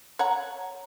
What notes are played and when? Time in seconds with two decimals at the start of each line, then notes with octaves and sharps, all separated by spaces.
0.19 C#5 F#5 A#5